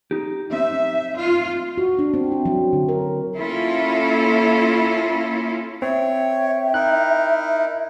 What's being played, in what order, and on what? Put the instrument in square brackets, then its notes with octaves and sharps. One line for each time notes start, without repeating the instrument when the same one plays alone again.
[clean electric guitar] D#4 G4
[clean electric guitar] C4 D#4 C5 [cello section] E5
[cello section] F4
[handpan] F#4
D4
C4
E4
F#3
D3
A#4
[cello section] A#3 C#4 E4 F4 A4
[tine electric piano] C4 [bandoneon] C#5 [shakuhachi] E5 [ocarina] G5
[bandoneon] D#4 E4 A#4 [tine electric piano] F#6